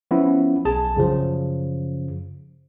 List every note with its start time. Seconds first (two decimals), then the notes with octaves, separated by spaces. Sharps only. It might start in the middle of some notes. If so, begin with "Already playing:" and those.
0.11 F3 B3 C#4 E4
0.65 B1 G#4 A5
0.96 F#2 C#3 F3